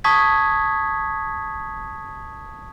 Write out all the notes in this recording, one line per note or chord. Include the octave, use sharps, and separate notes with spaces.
A5 C#6 D#6 G#6 B6